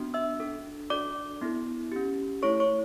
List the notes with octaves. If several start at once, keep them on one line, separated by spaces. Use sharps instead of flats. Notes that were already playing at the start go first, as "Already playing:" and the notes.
Already playing: B3 D4 F#4
E5 E6
D4 A4
D4 F#4 A4 D5 D6
B3 E4 A4
C#4 G4
A3 E4 A4 C#5 C#6
C#5 C#6